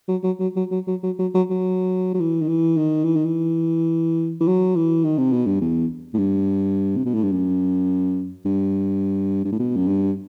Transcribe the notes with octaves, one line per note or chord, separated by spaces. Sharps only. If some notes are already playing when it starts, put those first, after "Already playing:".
F#3
F#3
F#3
F#3
F#3
F#3
F#3
F#3
F#3
F#3
F#3
E3
D#3
E3
D#3
E3
D#3
E3
E3
F#3
E3
D#3
C3
B2
G2
E2
A2
G2
C3
B2
A2
G2
F#2
G2
G2
A2
B2
F#2
G2